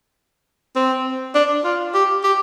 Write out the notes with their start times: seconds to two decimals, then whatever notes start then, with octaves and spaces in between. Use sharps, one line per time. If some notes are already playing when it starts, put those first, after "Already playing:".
0.76 C4
1.35 D4
1.64 F4
1.94 G4
2.24 G4